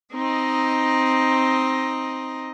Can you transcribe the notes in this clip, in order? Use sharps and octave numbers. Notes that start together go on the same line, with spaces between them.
C4 D#4 D#5